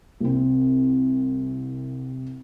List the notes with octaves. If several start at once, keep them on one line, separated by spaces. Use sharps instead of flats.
C2 C4